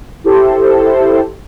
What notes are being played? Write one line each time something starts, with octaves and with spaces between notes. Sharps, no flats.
E4 G4 A4 C5